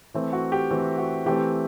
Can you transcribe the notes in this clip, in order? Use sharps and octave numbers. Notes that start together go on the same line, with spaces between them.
E3 A3 C4
F#4
G4
E3 A3 C4
F#4
E3 A3 C4 G4